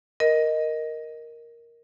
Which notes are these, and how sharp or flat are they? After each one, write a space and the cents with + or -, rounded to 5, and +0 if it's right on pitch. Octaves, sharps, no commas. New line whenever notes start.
A#4 +0 D#5 +0